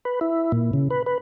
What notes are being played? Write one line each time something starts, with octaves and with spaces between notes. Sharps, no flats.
B4
E4
A#2
C#3
B4
B4